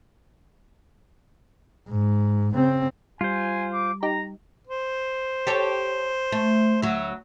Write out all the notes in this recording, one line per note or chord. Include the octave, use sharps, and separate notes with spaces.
G#2
C#3 C4
G3 F4 C5 G#5
D6
D#4 G4 A#5
C5
G4 A4 C#5
A3
D2 F#3 E5